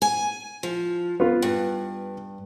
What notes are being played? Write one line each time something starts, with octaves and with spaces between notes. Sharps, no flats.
G#5
F3
B3 F4
G2